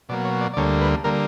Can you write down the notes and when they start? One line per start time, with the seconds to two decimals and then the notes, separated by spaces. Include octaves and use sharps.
0.09 B2 F#3 A#3 D5
0.25 C#5
0.41 D5
0.54 D5
0.57 D2 D3 G3 A#3 C#5
0.81 B4
1.04 D3 G3 A#3 A#4